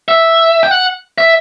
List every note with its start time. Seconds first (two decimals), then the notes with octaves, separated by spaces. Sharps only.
0.09 E5
0.63 G5
0.71 F#5
1.18 E5